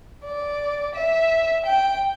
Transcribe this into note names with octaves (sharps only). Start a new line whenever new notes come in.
D5
E5
G5